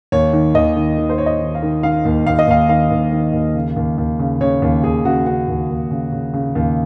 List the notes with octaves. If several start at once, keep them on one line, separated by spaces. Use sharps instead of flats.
D#2 C#5
D#3
D#2 D#5
D#3
D#3
C5
D#2 C#5
D#5
D#3
F5
D#3
D#3 F5
D#2
D#2 F5
D#5
D#2 F5
D#3 F5
D#2
D#3
D#2
C#3
D#2
D#2
C#3
C#3 C#5
D#2
D#2 G#4
C#3 F#4
C#3 F#4
D#2
D#2
C#3
C#3
C#3
D#2